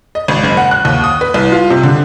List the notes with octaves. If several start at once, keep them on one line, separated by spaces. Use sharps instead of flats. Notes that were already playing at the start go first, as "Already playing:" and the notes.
D#5
G#1
F#1
F#5
F#6
D#2
D#6
B4
C2
F4
C3
D3